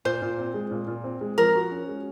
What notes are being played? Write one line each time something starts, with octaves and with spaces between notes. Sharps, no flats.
A#2 C5
A#2
C4
G#3
A#2
A#2
C4
G#3
F3 A#4
F#4
C#4
G#3